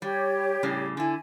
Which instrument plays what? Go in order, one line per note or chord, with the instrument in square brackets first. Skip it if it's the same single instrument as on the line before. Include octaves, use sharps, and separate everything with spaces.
[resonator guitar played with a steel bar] G3 [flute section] G4 C#5
[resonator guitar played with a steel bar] A2 C#3 G3
[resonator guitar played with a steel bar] D3 E4 [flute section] G#5